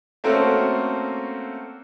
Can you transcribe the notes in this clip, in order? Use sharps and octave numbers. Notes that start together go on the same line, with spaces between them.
A3 A#3 C4 C#4 F#4 A4